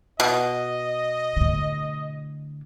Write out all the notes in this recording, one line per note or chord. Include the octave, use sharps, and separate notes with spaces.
B2 D#5
A2 D3